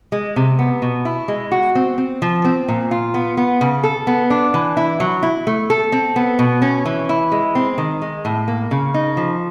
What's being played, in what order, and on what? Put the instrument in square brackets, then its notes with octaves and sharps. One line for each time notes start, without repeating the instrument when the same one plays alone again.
[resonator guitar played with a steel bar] G#3
C3
B3
B2
E4
G#3
F#4
C4
C4
F3
C4
A#2
F4
B3
B3
C#3
A4
B3
D4
E3
E4
F#3
E4
A3
A4
C4
B3
B2
C#4
E3
E4
G#3
C4
D#3
G#3
A2
A#3
C#3
D#4
F3